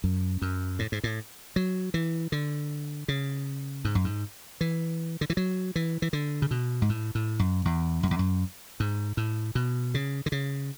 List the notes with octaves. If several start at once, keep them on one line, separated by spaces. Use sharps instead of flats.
F#2
F#2
A2
G#2
A2
F#3
E3
D3
C#3
G#2
F#2
G#2
E3
D3
E3
F#3
E3
E3
D3
C#3
B2
G#2
A2
A2
F#2
E2
F#2
E2
F#2
G#2
A2
B2
C#3
D3
C#3